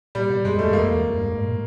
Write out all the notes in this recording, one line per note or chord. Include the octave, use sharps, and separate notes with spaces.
A#2 G3
B2
G2 G#3
F#2
A3
E2
F2 A#3
E2
F2
G2
G#2
A2
A#2